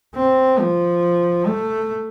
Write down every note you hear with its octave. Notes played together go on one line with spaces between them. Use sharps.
C4
F3
A3